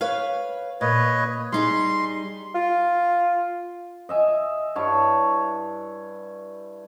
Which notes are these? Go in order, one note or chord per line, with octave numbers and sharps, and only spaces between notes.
B4 C#5 F5
A#2 B4 C#5 D#5
G3 D#4 G#4 C6
F4
D#5 E5 G#5
G2 E4 C#5 A5